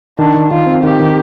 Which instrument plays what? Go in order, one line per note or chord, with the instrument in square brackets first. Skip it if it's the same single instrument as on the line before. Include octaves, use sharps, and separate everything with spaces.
[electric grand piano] D#3 [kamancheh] D4
[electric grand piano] D#3
[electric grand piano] D#3 [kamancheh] F4
[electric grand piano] C4
[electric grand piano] D#3 [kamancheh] G4
[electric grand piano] D#3